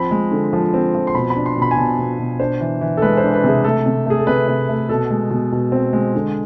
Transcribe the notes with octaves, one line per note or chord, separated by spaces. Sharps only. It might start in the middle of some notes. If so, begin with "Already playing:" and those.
Already playing: F3 C4 B5
G#3
D3
F3
C4
F3
C6
B2 B5
B5
D4
C6
B2
B5
G#5
B2 A5
B2
B2
D4 C5
E3
E3
A4
G#3 B4
C5
D4
B4
C3 G#4
A3 A4
C3
A3 G#4
A4
C3 B4
C3
A3
B2 A4
G#3
B2
B2
C4
G#3
D3